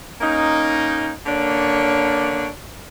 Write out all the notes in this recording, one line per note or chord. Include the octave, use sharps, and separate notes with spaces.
A#3 C#4 D#4
D3 A#3 C#4 D4 C#5